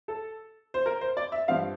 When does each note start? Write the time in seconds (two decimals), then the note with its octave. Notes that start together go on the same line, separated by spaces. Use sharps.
0.08 A4
0.74 C5
0.86 A#4
1.01 C5
1.17 D5
1.32 E5
1.48 G2 F3 C4 F5